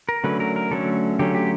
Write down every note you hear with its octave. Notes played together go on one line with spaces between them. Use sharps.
A#4
D3 F#3 A3 C#4 B4
A#4
A#4
D3 F#3 A3 C#4 A4
D3 F#3 A3 C#4 G4
G4